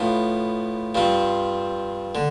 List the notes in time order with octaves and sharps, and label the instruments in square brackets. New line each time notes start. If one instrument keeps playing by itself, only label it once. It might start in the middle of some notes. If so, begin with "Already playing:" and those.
Already playing: [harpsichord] A2 F3 B3
G2 F3 C4
D3